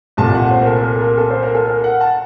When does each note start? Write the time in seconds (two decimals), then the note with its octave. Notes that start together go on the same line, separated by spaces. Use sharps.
0.17 C2 A#2 A3 A5
0.35 F#5
0.51 C5
0.62 A#4
0.67 A4
0.84 A#4
0.95 A4
1.01 A#4
1.18 A4
1.30 C5
1.43 A#4
1.55 A4
1.68 A#4
1.84 F#5
2.01 A5